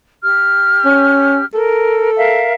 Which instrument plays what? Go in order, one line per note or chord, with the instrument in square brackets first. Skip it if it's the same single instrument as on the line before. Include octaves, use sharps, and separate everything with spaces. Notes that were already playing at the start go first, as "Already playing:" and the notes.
[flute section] G4 F6
[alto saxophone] C#4
[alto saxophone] A4 [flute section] A#4
[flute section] A#4 E5 F5